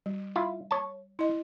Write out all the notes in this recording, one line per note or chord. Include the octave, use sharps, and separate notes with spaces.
G3
E4 F4
C#5 A5
E4 D#5